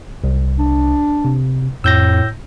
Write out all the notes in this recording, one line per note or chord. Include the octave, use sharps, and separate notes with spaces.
C2
D4
C3
F2 A2 E6 G6 A#6